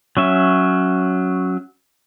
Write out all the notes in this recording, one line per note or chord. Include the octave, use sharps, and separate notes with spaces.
F#3 C#4 E5